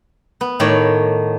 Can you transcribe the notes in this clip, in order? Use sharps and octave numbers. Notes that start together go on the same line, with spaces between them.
B3
A2 D#3 C#5 D5